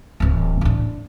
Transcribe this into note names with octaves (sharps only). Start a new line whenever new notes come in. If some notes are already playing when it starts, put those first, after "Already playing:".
D1 E3
A2 D4